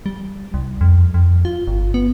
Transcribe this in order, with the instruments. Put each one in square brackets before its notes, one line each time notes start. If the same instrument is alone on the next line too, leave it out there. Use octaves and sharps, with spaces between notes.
[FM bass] G3
C2
F2
F2
F4
G1
B3